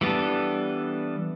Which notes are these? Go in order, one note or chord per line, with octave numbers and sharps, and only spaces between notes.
E3 G3 B3 D4 A4